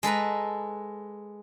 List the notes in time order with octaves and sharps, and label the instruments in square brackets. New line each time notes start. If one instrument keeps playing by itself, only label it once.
[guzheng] G#3 A4 B4 A#5